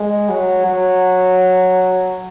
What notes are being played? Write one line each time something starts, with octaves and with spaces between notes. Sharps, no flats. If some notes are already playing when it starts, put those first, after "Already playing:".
Already playing: G#3
F#3
F#3